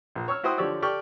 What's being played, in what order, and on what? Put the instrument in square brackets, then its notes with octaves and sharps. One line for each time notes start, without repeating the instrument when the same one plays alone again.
[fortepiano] A#1
C#5 C#6 E6 F6
E4 F#4 C5 G5 C6 D#6
D3 F3 G4 C#5 D5 E6
G4 A4 D5 G5 C#6 F6